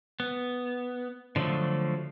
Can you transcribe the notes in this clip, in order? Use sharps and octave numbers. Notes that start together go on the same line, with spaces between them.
B3
D3 F3 F#3 A3